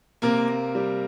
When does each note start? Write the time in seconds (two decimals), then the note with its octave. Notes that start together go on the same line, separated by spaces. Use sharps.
0.22 C3 A#3 A#4
0.48 A#3
0.75 G3